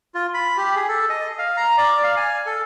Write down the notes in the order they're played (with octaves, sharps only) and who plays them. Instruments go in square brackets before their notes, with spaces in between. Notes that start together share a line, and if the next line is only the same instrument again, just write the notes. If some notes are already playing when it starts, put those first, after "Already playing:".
[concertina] F4
B5
G4
G#4
A4
D#5
F5
A#5
D5
F5
G#5
A4